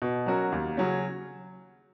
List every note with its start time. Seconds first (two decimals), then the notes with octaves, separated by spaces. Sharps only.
0.02 B2
0.26 F#3 C#4 F#4 A#4
0.52 D#2
0.77 C#3 F#3 C#4